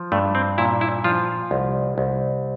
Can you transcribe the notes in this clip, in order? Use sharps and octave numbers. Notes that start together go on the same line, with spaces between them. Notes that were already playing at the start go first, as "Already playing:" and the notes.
Already playing: F3
G2 A3
C4
A#2 E4
E4
F3 F4
C2
C2